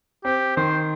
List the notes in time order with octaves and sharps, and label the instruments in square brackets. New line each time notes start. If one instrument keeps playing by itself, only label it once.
[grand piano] C4 [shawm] G4
[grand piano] D#3 [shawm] C5